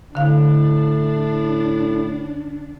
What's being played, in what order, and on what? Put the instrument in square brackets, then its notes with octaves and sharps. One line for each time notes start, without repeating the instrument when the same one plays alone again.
[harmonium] A2 [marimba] D3 F5 [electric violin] D4